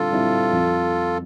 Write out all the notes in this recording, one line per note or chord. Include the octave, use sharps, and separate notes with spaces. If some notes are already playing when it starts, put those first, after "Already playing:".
Already playing: D3 G3 C4 F4 A4
G3 C4 E4
F2